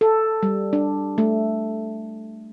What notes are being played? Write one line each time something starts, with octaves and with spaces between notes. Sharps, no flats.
A4
G3
D4
A3